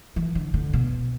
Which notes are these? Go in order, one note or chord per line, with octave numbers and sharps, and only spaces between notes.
E3
D3
D3
B2